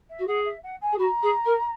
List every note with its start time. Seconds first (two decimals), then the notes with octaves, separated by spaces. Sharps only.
0.10 E5
0.19 F#4
0.27 G#4 F#5
0.45 E5
0.63 F#5
0.81 G#5
0.92 G#4
0.98 F#4 B5
1.04 A#5
1.23 G#4
1.45 A#4